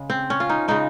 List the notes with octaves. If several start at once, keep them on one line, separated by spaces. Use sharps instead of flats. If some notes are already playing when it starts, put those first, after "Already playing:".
Already playing: C#3 G#3
C4
C#4
F4
D#4
C#3 G#3 D#4